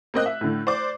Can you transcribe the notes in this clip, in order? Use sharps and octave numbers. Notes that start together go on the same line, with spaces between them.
A#3 C4 D#5 F#6
E5
A2 D3
C5 D5 D6